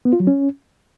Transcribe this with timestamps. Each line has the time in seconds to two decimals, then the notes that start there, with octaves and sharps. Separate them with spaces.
0.05 B3
0.13 F4
0.20 F#3
0.27 C#4